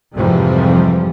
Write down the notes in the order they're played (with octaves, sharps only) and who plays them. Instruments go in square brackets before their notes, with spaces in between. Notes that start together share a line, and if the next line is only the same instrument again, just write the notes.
[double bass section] F2 G#2 C3 E3 F3 G3